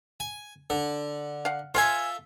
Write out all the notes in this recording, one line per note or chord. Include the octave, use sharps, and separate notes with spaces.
G#5
D3
F5 F#5
F4 A4 C5 E5 F5 G#5